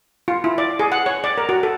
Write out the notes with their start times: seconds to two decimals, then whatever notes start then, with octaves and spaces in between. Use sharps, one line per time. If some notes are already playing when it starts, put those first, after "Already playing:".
0.28 F4
0.44 E4
0.58 D5
0.79 G#4
0.92 F#5
1.06 C#5
1.24 D5
1.38 A#4
1.49 F#4
1.63 A4